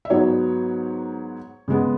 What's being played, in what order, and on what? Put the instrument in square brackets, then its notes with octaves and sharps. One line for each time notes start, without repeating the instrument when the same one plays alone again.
[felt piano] E5
G#2 F#3 B3 C#5
C#3 G#3 B3